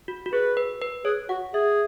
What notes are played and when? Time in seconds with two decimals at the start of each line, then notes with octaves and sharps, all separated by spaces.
0.08 F#4
0.26 F#4
0.33 G#4 B4
0.57 B4
0.82 B4
1.05 G#4 C#5
1.29 F#4 F#5
1.54 G#4 E5